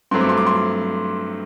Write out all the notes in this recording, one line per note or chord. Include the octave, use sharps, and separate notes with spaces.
G2 F#3 A3 C4 C6
D6
C6
D6
C6